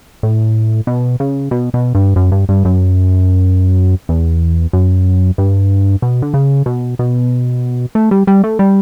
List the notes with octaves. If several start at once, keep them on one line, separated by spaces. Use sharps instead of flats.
A2
B2
C#3
B2
B2
G2
F#2
G2
G2
F#2
E2
F#2
G2
B2
D3
C#3
B2
B2
A3
G3
G3
A3
G3